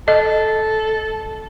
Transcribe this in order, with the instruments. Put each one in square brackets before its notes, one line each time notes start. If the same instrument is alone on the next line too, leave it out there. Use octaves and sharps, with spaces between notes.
[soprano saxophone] A4 [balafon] D#5